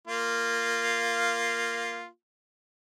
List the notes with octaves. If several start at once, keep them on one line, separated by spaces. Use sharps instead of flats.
A#3 F4